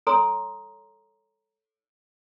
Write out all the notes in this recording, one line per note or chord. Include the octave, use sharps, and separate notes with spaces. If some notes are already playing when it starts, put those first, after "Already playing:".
A4 C#5 A#5 C6 D#6